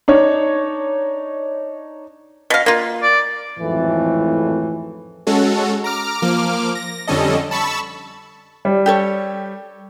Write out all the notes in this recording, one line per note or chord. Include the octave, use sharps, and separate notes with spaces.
D4 D#4 C#5
B2 F5
A#3 F4
D5
G#1 F2 A2 E3 A3
G#3 C#4 F#4 A4
A#5 D6 F6
F3 A#3 D6 F6
A#6
F2 D3 G3 C#4 A4 D#5
A5 B5 C#6 E6
G3
G4 A4 C#5